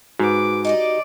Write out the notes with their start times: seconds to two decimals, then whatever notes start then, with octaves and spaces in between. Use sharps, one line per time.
0.19 G#2 F#4 B4 D6
0.65 D#4 G4 D5 D#5 D6